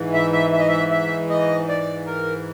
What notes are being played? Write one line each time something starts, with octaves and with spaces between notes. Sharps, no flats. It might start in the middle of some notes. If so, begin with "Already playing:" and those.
Already playing: G#2 E3
E5
E5
E5
D#5
E5
E5
D#5
D5
A#4